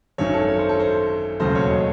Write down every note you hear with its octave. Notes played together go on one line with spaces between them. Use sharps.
G#1 F#2 D#3 C#5
A4
C#5
C5
A4
C5
E1 D#2 C#3 F#3 A3 C5
C#5
D#5